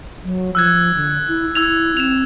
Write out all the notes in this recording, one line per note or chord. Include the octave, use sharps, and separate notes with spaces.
F#3
F3 E6 F#6 G#6
D3
E4
E4 E6 G#6 F7
C4 E7 F7